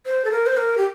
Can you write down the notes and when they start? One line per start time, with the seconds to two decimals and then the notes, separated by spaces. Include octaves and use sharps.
0.06 C5
0.25 A4
0.31 A#4
0.46 C5
0.57 A#4
0.78 G4